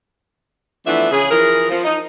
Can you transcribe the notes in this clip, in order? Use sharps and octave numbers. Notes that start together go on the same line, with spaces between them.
E3 F3 A3 B3 D4 E5
C#3 G#4
E3 F3 G#4 A#4
F3
D#4